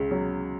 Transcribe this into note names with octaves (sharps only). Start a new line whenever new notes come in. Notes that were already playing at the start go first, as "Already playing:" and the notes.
Already playing: C#2 C#3
F#3